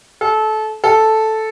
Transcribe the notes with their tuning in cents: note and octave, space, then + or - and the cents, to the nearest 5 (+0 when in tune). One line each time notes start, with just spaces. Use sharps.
A4 -25
A4 -5